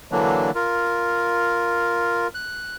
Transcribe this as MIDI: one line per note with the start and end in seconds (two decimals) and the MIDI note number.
0.12 0.51 50
0.12 0.51 52
0.12 0.51 54
0.12 0.51 58
0.12 0.51 62
0.55 2.28 65
0.55 2.28 70
2.35 2.76 90